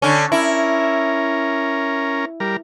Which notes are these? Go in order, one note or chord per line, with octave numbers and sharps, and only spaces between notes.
D3 C#4
C#4 E4 A#4
G3 A#4